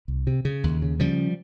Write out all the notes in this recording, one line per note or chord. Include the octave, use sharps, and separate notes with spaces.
C2
C3
C#3
D#2
C#3
C#3 F3 G3